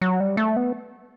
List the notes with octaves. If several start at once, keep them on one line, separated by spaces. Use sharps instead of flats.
F#3
G3
A3
B3